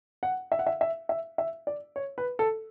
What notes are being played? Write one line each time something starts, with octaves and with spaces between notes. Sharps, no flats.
F#5
E5
F#5
E5
E5
E5
E5
D5
C#5
B4
A4